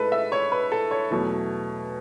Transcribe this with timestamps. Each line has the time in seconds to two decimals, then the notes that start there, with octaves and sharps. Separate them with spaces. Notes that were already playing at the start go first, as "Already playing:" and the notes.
Already playing: A2 G#3 A4 B4
0.12 E5
0.32 C#5
0.52 B4
0.72 A4
0.91 C#5
1.11 E2 B2 F#3 A3